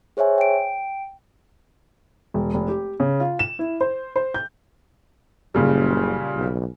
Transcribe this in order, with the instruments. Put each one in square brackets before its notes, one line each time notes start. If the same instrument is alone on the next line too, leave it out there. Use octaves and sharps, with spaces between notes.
[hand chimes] G#4 C5 C#5 E5 G#5
G5 D7
[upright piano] E1
F1
G4
C#3
F4
E7
E4
C5
C5
G6
[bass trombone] F#1 [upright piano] A#2 C#3 G3
[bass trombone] B1